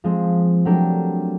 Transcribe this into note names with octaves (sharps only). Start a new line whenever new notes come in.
F3 G#3 C4
F#3 A3 D4 G4 A#4